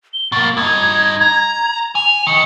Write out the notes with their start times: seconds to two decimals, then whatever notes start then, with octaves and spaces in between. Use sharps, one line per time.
0.13 G7
0.32 B2 A#3 A6
0.57 G2 D#4 G#6
1.21 A#5
1.95 G#5 F7
2.27 D#3 C#7